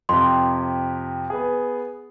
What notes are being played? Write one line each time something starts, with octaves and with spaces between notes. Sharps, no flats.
F2 C3 C6
B3 G#4